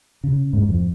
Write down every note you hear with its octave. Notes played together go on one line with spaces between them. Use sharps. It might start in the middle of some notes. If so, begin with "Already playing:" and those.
C#3
G#2
F2